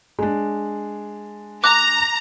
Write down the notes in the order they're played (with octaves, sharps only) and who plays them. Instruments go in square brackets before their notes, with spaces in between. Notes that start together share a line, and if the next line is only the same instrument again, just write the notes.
[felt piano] G#3 D4
[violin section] A#5 [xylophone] D6 F#6